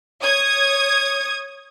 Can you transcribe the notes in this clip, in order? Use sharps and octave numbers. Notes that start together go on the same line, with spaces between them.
C#5 D#6 G#6